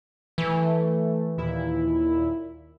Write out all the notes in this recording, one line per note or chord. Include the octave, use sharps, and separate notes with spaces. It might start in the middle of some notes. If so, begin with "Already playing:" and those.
E3 A3
D#2 A#2 E4